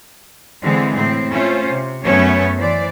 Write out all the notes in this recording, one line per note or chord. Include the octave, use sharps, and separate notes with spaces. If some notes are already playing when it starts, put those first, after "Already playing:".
D3 E3 G#3 C4
A2 C4
A3 C#4 F4 C5
C3
F#2 A3 B3 C#4 C#5
E3 C5 D5